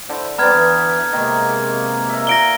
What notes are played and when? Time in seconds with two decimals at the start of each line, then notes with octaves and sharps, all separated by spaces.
0.09 D3 E4 C5
0.38 G3 B3 C4 D5 A#5 F6 G#6
0.52 E3
1.13 C3 D#3 G#3 A#3
2.10 E5 A#5
2.27 A#2 A#6 D7 G7